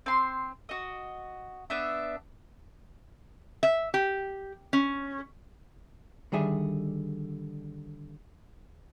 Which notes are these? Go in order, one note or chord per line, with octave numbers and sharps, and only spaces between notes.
C4 C6
F#4 D#5
B3 D4 E5
E5
G4
C#4
D3 D#3 G3 G#4 E5